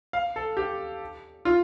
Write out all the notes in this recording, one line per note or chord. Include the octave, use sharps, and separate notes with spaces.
F5
A4
G4
F4